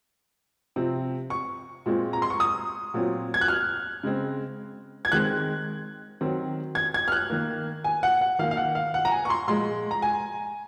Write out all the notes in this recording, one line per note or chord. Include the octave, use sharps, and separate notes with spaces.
C3 F3 C4
C#6
A#2 G#3 C4
A#5
C6
C#6
D#6
A#2 F#3 C4
G#6
F#6
F6
C#3 G#3 C4
G#6
D#3 G#3 C4 F#6
D#3 F#3 C4
G#6
G#6
F6
F#6
D#3 A#3
G#5
F#5
F#5
D#3 A#3 F5
F5
F#5
F5
F#5
A#5
G#5
C#6
C6
A#2 F3 G#3 C6
A#5
G#5